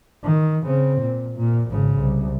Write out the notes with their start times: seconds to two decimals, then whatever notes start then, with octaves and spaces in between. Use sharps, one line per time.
0.24 D#3
0.66 C#3 C4
1.01 A#2
1.36 A#2
1.70 G#1 C#3
1.99 C2